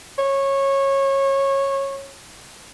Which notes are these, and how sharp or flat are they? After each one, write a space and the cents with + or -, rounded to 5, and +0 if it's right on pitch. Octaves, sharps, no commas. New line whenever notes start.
C#5 -15